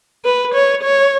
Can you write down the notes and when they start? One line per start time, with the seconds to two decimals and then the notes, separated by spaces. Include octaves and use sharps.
0.25 B4
0.54 C#5
0.83 C#5